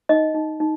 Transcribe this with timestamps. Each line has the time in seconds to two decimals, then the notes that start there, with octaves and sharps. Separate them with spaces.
0.09 D#4 D#5
0.34 D#4
0.60 D#4